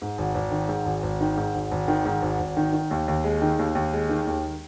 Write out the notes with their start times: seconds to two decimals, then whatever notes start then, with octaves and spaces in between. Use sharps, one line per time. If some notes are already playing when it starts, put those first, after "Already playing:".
0.02 G#2
0.18 G#1
0.35 G#1
0.52 D#3
0.69 G#2
0.86 G#1
1.03 G#1
1.21 D#3
1.37 G#2
1.55 G#1
1.72 G#1
1.88 D#3
2.05 G#2
2.22 G#1
2.40 G#1
2.57 D#3
2.73 D#3
2.91 D#2
3.08 D#2
3.24 G#3
3.42 D#3
3.59 D#2
3.75 D#2
3.93 G#3
4.09 D#3
4.27 D#2